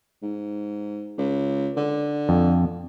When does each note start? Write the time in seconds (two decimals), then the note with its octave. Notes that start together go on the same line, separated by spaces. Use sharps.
0.22 G#2
1.18 C#2
1.76 D3
2.29 F2